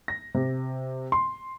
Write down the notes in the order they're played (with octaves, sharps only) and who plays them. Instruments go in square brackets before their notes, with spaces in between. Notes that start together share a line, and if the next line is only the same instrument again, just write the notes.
[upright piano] A#6
C3
C6